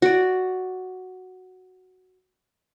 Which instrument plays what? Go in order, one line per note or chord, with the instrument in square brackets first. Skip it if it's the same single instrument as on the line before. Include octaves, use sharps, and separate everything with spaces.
[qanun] F#4 D5